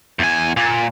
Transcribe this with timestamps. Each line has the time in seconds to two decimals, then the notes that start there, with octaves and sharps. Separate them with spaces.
0.19 E2 G#5
0.57 A#2